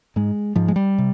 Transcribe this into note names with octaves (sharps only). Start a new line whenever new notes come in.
G#2 G#3
G#2 F3
G#3
G3
C3